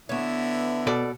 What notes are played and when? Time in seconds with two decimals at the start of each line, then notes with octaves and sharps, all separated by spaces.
0.09 D3 B3 E4 C#5
0.87 B2 A4 D5